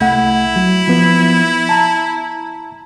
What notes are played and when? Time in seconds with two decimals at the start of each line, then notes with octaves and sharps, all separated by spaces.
0.01 C2 A3 E4 F#5
0.56 F#3
0.88 F3 B3
1.69 A5 A#5